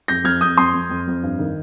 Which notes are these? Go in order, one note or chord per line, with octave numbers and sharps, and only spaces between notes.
F2 G6 A#6
F2 F6 G#6
F2 D#6 G6
F2 C6 D#6
F2
F2
F2
G2
D#3